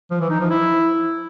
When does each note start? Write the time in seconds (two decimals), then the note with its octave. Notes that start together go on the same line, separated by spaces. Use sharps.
0.11 F3
0.21 E3
0.30 D#4
0.40 F3
0.50 E4